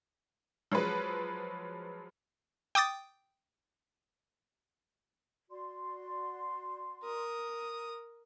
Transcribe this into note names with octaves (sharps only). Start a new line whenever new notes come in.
F3 F#3 G#3 B4
G5 D6 D#6 A6
F#4 D5 C6
A#4 D#6